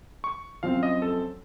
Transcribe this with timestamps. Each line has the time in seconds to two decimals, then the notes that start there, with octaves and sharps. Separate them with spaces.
0.24 C#6
0.63 F#2 F3 C4 F5
0.83 D#5
1.02 A4